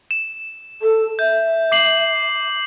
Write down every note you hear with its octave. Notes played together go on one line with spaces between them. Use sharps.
E7
A4
E5 G6
D6 C7 F#7